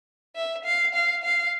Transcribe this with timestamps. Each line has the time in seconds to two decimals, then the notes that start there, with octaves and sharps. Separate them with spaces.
0.36 E5
0.65 F5
0.95 F5
1.24 F5